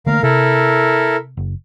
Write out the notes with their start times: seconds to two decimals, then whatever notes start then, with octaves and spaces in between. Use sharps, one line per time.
0.06 D3 A3 A#3 A#4 F5
0.23 C3 E4 A4 A#4
1.37 F#1